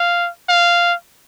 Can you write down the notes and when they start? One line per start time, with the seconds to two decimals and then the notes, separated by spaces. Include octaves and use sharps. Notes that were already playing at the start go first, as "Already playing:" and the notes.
Already playing: F5
0.49 F5